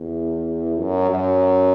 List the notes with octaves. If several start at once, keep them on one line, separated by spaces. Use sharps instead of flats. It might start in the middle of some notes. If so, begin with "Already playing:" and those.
Already playing: E2
F#2
F#2